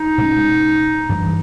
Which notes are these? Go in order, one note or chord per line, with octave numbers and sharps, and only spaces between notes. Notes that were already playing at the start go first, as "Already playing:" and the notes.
Already playing: D#4
B2 G#3 C#4
G2 E3 G3